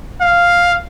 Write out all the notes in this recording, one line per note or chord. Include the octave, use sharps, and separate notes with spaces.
F5